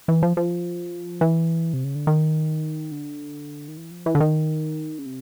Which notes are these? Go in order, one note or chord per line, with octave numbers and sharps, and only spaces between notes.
E3
F3
F3
E3
C3
C#3
D3
D#3
D3
D#3
E3
F3
E3
D3
D#3
C#3
C3